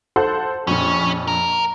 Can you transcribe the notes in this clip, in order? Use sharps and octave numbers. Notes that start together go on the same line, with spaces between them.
A4 C5 F#5
A#1 F2 C#4
A#4